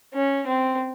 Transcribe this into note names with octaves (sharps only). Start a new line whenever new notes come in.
C#4
C4